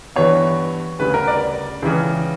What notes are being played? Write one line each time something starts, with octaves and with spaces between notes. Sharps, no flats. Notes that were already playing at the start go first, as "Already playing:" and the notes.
G2 E3 B3 C#5
D2 C#3 G3 B4
A#4
D5
C#2 C#3 E3